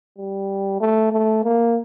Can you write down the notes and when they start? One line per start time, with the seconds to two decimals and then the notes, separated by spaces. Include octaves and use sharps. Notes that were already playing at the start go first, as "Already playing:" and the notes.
0.18 G3
0.81 A3
1.13 A3
1.44 A#3